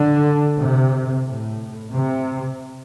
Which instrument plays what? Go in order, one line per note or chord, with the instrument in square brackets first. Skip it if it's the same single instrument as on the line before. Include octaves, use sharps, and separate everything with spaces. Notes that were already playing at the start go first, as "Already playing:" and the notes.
Already playing: [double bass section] D3
C3
A2
C3